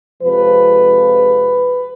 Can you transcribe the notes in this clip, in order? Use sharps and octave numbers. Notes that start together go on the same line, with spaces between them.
F2 C3 F3 G#3 B4